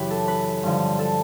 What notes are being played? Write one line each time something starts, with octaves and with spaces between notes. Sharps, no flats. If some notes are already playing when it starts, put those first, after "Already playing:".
Already playing: F#2 C#3 E3 E4 G4 B4
A4
B4
G2 D3 F3
A4